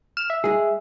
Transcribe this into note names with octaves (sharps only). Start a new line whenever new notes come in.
F6 E7
E5
G#3 G#4